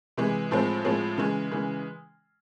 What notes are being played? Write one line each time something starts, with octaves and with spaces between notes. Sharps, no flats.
C3 E3 G#3
A2 F3 G#3 C4
A2 F3 G#3 C4
C#3 E3 G#3
C#3 E3 G#3